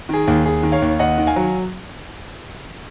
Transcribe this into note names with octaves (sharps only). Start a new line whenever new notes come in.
D#3 G#4
D#2
D#2 G#4
D#3
C#5 F5
D#2
D#2 D#5 F#5
D#3
F5 G#5
F#3